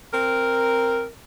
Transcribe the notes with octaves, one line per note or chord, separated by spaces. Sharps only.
C4 A#4